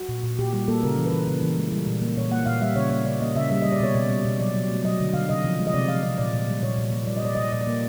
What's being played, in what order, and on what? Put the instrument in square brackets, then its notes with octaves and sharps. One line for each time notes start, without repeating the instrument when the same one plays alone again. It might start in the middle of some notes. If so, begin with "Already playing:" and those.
Already playing: [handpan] F#4
A#2
A#2
A#2 G4
G3 G4
A#3 A4
C#3 A#4
E3
B4
E3
C#3
E3
G#3
G3
A#2
A#3
A#2 C#5
A#3 F#5
A#2 F5
G3 E5
C#3 C#5
A#3 C#5
C#3 D5
A#3 D#5
C#3 E5
G3 E5
G3 D#5
D5
B2 C#5
B2 D5
G3
B2
F#3 D5
F#3
A3
F#3 D#5
D3
D3 F5
C3 D#5
F3
G#3
D#5
C3 D5
F3 F5
C3 D#5
A#2 D5
A#2
G3
A#2 C#5
A#2
A#3
G3 D5
D#5
A#2 D5
A#2 D#5
D5
A#2 D#5
D5
A#3